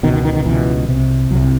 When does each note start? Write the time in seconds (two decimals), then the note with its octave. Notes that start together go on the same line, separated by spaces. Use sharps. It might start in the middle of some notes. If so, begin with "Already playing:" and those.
0.03 B2 D#3
0.07 C#2
0.13 D#3
0.24 D#3
0.35 D#3
0.46 C#2 B2 E3
0.89 C2 C3
1.31 C2 F#3
1.35 C3